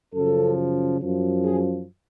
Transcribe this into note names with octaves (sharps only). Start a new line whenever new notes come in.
F#2 C#3 F3 A4
F#2 F3
G#4